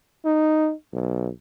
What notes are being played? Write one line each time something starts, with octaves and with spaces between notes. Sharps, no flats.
D#4
B1